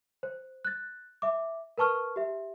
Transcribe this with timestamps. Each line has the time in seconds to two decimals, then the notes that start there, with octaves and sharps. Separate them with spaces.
0.23 C5
0.65 F#6 A6
1.22 E5 D6
1.78 A#4 B4 A5 C#6 F6
2.16 G4 E5